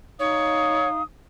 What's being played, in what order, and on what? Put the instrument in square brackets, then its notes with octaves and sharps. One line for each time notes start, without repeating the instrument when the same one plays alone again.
[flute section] D#4 F5 D#6 [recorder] C#5